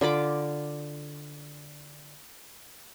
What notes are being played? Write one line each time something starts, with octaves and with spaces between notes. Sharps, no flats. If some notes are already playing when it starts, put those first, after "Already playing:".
D3 F4 B5 D6